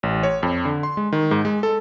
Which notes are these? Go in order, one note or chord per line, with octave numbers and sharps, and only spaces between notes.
A1
C#5
F2
D3
C6
G#3
D#3
G#2
G#3
A4